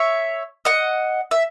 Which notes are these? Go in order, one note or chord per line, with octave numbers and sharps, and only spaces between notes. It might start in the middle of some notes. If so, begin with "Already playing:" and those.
Already playing: C#5 E5
D#5 F#5
E5